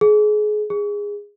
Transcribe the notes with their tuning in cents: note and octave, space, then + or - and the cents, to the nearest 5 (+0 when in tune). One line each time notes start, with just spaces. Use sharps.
G#4 +30
G#4 -15